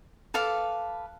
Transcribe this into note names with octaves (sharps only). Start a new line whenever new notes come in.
A4 B4 F5 D6